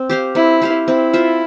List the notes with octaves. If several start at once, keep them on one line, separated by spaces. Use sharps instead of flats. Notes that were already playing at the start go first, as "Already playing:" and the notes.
Already playing: C4
G4 C5 F5
C4 E4
G4 C5 F5
C4 E4
F4 C5 E5